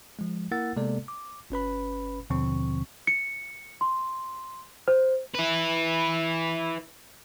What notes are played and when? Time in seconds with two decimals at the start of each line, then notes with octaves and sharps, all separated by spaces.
0.19 F3 G#3
0.51 A#3 E4 A#4 F#5 E6 A6
0.77 C3 G#3 A#3 B3 A4 D5
1.08 D6
1.50 G1 C#4 B4 B5
2.30 D#2 B2 D3 F3 C4 C#6
3.07 C#7
3.81 C6
4.88 C5
5.34 E4 B4